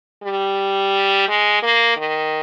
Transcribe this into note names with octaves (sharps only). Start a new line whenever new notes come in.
G3
G#3
A#3
D#3